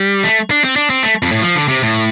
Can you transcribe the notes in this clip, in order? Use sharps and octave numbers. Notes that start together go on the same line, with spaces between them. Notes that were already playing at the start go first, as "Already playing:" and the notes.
Already playing: G3
A3
D4
C4
D4
C4
A3
F2
A2
F3
D3
C3
A2